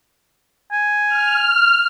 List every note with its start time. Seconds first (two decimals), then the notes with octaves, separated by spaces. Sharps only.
0.72 G#5
1.07 F6